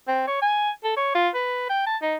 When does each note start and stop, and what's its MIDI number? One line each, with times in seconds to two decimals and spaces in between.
0.08 0.26 60
0.27 0.38 73
0.42 0.70 80
0.84 0.92 69
0.97 1.14 73
1.15 1.29 65
1.34 1.65 71
1.69 1.82 79
1.86 1.97 81
2.02 2.16 63